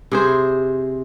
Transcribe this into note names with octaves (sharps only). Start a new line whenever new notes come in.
C3 G#4 C5